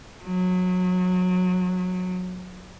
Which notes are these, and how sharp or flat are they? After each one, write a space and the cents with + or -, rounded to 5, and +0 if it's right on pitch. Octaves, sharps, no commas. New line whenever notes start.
F#3 -25